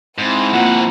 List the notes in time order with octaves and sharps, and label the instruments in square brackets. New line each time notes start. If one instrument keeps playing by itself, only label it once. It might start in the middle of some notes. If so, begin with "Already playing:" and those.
[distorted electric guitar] G#2 [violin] C4 E4
[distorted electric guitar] F2 B2 [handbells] A#3 F4 A#5 [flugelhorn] F#5